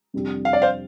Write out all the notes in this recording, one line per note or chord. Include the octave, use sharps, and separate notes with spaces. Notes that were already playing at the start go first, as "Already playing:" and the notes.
F2 C3 G3 D4 G4
F5
D5
C5 F5